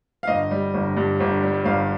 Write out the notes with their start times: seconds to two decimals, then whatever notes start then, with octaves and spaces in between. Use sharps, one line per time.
0.23 F5
0.27 G1 D#5
0.51 G3
0.74 G1
0.97 G2
1.20 G1
1.42 G3
1.65 G1 F5